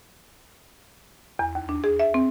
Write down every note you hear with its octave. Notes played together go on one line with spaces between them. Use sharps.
E2
D#2
D4
G#4
E5
C4